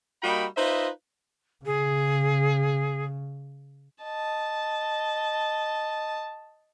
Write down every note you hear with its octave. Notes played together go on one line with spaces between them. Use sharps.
G3 A#3 D#4 F#4 G5 B5
D#4 F4 B4 C5 D#5 E5
C#3 G#4
D#5 A5